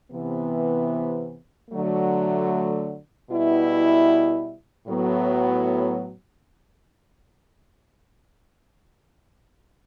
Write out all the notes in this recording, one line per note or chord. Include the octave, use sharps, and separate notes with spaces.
C3 E3 B3
D3 F#3 A3
B2 G3 B3 E4
A2 F#3 B3